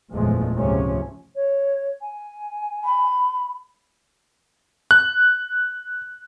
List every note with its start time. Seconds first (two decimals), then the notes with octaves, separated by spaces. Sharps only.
0.11 F#1 E2 A#2 F3 G#3 A3
0.56 C#2 G#2 C3 F3 A3 C#4
1.36 C#5
2.02 G#5
2.85 B5
4.91 F#6